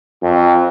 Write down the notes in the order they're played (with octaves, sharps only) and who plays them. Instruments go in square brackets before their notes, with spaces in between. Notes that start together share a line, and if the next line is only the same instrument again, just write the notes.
[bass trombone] F2